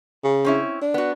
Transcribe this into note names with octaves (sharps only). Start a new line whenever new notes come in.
C#3
C4 C#4 E4
D4
B3 F#4